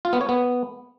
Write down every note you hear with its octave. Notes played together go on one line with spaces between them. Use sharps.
F4
B3
C#5
B3